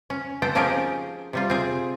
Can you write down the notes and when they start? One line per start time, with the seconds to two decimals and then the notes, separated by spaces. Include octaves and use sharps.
0.10 C#4
0.42 B3 C4 A4 G5
0.55 F3 C#4 D#4 G4 G#4 A#4
1.33 C3 G3 F4
1.50 C4 G#4